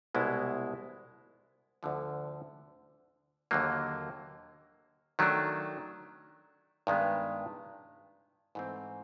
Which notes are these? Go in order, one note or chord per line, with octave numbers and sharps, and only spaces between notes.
C2 B2 G#3 B3 E4
D2 D3 F3
D#2 D3 F#3 A#3
D#3 F#3 A3 D4
G2 D#3 G#3 B3
G#2 E3 A3 C4